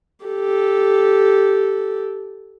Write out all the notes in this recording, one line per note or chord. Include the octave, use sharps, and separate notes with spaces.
G4 A4